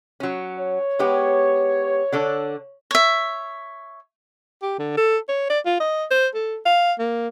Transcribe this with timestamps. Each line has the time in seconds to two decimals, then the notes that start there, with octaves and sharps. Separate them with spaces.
0.20 F#3 C#4
0.58 C#5
0.99 G#3 B3 G4
2.12 D3 D4 A4
2.91 C#5 E5
4.63 G4
4.79 D3
4.97 A4
5.29 C#5
5.50 D5
5.66 F4
5.80 D#5
6.11 C5
6.34 A4
6.66 F5
6.99 A#3